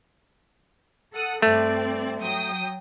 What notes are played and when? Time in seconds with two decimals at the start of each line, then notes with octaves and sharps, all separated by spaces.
1.12 A4 F#5 D#6
1.42 G2 A3 C4 D5
2.19 F#3 G5 D#6